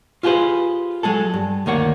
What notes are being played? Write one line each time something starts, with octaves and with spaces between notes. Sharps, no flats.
F4 G4 G#4 B4 C5
F#3 G#3 G#4 A4
G2
D2 D#3 A#3 C#5 F#5